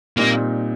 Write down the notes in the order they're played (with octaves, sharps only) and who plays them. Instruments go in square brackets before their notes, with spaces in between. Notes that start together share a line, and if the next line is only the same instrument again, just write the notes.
[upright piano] A#2 G3 C4 D#4 [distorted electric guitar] A#3